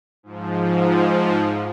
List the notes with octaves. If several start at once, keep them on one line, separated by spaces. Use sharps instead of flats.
G#2 F3